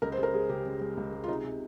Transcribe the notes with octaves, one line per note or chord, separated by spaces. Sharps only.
C#2 A#4
C5
C#3
A#4
G#3 G#4
C#3 G4
C#3
G#3
C#2
G#3
F4
C3 D#4
C3